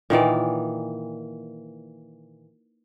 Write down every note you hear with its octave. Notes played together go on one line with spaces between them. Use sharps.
A#2 D#3 E3 D5